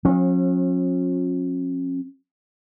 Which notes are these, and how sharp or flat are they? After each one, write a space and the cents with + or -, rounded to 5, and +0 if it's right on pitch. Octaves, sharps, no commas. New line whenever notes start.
F3 +45 C#4 -40